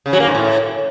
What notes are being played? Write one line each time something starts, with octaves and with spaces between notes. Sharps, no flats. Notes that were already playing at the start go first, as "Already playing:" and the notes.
C#3
F#3
A#3
G#2
A2